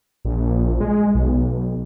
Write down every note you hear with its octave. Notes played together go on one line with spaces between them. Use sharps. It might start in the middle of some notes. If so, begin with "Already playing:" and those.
A#1
G#3
B1